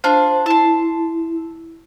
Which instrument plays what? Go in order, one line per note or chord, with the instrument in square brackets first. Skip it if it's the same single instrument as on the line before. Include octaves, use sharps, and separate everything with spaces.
[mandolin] D4 F4 [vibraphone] C5
[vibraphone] E4 [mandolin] A5 C6